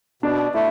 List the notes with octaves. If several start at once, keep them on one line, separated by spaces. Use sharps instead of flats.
B2 D4
A3 E4